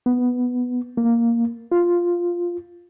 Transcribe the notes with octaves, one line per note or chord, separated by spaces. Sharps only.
B3
A#3
F4